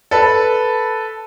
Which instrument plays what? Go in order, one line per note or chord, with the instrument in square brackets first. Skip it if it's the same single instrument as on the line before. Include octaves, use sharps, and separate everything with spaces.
[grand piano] A4 B4